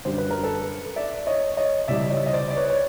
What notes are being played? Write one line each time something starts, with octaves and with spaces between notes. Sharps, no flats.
F#2 D3 G3 C5
B4
A#4
A4 B4
D5 E5
C#5 D#5
C#5 D#5
C#2 C3 E3 G3 D5 E5
C#5 D#5
D#5
C5 D5
D5
B4 C#5
C#5